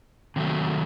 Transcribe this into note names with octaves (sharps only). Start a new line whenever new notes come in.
C3 D#3 F#3 A3